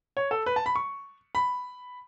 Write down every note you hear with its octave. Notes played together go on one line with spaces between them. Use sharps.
C#5
A4
B4
A5
B5
C#6
B5